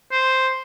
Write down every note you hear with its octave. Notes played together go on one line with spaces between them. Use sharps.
C5